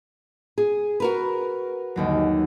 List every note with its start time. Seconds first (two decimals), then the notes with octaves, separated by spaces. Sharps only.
0.58 G#4
1.00 F#4 A#4 B4
1.96 G1 D#2 F#3